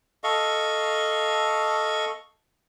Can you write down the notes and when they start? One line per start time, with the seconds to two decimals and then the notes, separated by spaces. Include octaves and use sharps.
0.24 A4 D#5 F5 C#6